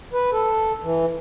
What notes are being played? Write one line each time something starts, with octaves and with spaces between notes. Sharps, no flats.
B4
A4
E3